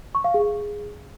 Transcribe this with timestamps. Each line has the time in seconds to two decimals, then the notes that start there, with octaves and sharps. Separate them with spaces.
0.15 C#6
0.24 F5
0.34 G#4